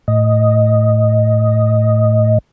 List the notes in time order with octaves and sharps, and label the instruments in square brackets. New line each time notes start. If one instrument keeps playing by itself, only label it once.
[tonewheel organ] A2 D#5